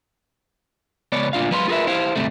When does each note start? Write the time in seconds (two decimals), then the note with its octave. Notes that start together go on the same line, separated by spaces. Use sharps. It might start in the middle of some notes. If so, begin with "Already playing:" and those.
1.12 C#2 B3 C#5 D5
1.33 D2 A#2 D4 F4 F5
1.51 F#3 G#3 B4 F5 B5 C6
1.68 F4 G#4 A#4 B4 E5
1.87 E4 G4 C5 F5
2.15 D2 G2 C3 G3 A3